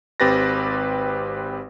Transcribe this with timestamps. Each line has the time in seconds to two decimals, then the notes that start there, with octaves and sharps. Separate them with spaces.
0.20 G#1 C4 G4 B4 A6 A#6